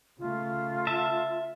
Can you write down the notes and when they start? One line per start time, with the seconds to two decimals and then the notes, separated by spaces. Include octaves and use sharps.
0.19 C#3 A3 F4
0.87 E5 A5